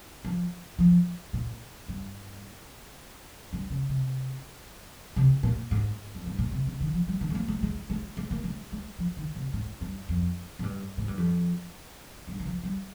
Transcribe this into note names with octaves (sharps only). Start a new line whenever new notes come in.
F3
F3
A#2
G2
G2
C#3
C3
C3
A#2
G#2
F2
G2
A#2
C3
C#3
D#3
F3
G3
D#3
G#3
A#3
G#3
G#3
G#3
G#3
A#3
G#3
G#3
F3
D#3
C3
G#2
G2
F2
G#2
G2
G#2
G2
F2
G2
D#3
F3
G3